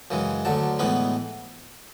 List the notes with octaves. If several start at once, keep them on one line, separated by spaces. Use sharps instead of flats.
F#2 C#3 E3 G#3
D2 D3 F#3 A5
A2 E3 G#3 B3 B5